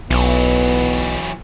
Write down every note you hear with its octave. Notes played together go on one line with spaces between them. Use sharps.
B1 E3 F#3 B3